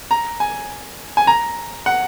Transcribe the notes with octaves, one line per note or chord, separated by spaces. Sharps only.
A#5
G#5
G#5
A#5
F#5